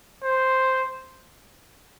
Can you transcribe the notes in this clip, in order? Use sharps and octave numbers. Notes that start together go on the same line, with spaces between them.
C5